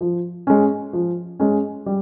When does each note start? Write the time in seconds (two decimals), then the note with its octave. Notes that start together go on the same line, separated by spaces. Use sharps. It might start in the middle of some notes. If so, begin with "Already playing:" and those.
0.01 F3
0.47 G#3 C#4
0.93 F3
1.40 G#3 C#4
1.86 G3